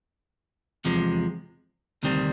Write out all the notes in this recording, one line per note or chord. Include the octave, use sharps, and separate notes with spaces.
E2 C3 F3 G#3
D2 C3 D#3 G3 C4